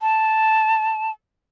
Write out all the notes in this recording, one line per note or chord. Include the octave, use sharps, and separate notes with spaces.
A5